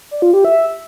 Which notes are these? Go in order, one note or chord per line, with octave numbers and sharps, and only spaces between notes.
D5
F4
G4
E5